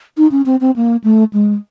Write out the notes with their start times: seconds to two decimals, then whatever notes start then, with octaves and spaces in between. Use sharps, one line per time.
0.17 D#4
0.31 C#4
0.46 C4
0.61 C4
0.76 A#3
1.04 A3
1.33 G#3